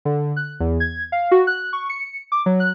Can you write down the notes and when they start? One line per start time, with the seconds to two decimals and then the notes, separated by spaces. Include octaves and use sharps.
0.05 D3
0.36 F#6
0.60 E2
0.80 G#6
1.12 F5
1.31 F#4
1.47 F#6
1.73 C#6
1.89 C#7
2.32 D6
2.46 F#3
2.60 F#6